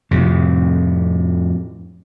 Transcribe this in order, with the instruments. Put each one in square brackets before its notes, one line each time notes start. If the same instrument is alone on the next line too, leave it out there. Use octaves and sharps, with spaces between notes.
[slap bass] F2 A2 C3